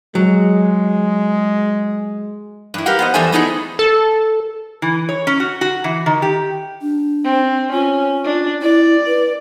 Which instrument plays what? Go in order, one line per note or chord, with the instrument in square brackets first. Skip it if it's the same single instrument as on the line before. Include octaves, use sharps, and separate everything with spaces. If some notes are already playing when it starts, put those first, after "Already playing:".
[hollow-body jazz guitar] F#3 [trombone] G#3
[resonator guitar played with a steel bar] G2 E4
G4 A#4 B4 F5 F#5
B3 C5 D#5
E2 G3 A4 C5 E5 G#5
A3 B3 D#4 E4 F#4 G#4
[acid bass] A4
[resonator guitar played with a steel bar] E3
C#5
C#4
F#4
F#4
E3
D#3
G4
[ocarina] D4
[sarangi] C4
[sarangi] C#4 [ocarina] F4
[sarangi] D4
[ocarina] E4 [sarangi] D5
[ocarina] B4